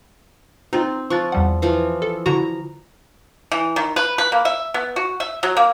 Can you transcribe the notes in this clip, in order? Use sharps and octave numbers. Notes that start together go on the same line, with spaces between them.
C4 D#4 F4
F3 C#6 F#6 A6
E2 G3 F#5
E3 F3
A4
D3 E4 F#4 A#5
E3
D#3
B4
B4
A#3
E5
B3
F#4
E5
F#3
A#3